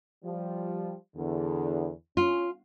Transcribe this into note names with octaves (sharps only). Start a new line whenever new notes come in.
F3 G3
E2 D3
C#4 F4